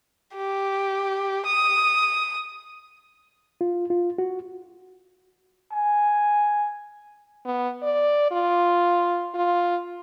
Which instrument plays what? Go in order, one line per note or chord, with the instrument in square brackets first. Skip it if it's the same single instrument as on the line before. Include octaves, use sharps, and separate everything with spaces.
[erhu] G4
D#6
[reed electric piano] F4
F4
F#4
[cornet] G#5
[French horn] B3
D5
F4
F4